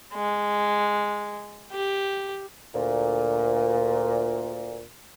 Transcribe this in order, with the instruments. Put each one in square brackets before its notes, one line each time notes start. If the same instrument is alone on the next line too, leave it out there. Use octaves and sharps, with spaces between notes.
[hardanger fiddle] G#3
G4
[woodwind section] D2 A#2